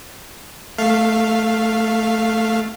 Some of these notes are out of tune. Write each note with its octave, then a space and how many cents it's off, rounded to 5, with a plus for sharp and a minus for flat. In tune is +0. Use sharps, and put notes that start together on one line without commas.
A3 +0 F5 +0